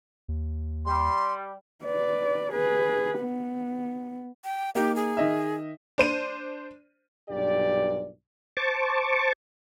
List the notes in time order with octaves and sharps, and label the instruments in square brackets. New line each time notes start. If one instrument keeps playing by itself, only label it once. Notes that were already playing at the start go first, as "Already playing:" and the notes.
[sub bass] D#2
[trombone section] G3 [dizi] C6
[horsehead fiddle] B4 D5
G#4 B4
B3
[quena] G5
[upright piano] A#3 D#4 [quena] G4
[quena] G#4
[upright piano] D#3 D#5 E5
[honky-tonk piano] D4 C5 D#7
[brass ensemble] B1 G2 A#2 G4 D5
[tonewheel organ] C5 A5 C#6 D6